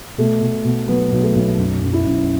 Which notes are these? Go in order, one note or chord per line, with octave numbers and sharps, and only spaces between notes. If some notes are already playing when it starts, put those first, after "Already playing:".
B2 A3 A4
B2
B2
F#3 B3 B4
B1
A3 A4
B1
F#1
F#1
E4
F#1